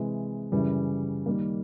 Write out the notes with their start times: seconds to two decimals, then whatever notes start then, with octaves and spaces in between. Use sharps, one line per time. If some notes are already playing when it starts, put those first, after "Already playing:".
Already playing: C3 E3 G#3
0.52 F#2 C#3 E3 G3
1.26 D#3 G3 A#3